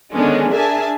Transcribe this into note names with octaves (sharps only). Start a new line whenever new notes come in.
D3 D#3 G#3 B3 C#4 D4
D4 G#4 A#4 E5 G#5 A5